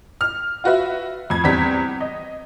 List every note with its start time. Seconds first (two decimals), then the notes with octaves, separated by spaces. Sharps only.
0.21 F6
0.64 F4 F#4 B4 E5
1.30 F2 G#6
1.44 E2 G3 C4 B6
2.01 D#5